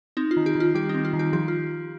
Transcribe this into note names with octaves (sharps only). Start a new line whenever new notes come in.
C4 D#4
F4
D#3
G4
D#3 F4
G3 G4
D#4
C4
F4
D#3
G4
F3 G4
F4